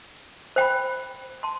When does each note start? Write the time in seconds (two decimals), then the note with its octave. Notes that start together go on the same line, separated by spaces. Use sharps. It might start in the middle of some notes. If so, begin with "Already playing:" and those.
0.56 C5 G5 B5
1.43 A5 C6